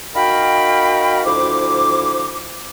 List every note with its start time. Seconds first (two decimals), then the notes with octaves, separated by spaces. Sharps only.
0.15 D#4 F#4 A#4 F5 G5 B5
1.26 D2 F3 E4 C5 D6